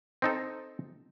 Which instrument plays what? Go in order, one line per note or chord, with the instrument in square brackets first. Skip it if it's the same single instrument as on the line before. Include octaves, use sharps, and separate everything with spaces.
[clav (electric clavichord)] C4 D#4 A4